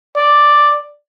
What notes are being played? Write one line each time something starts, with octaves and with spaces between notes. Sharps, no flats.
D5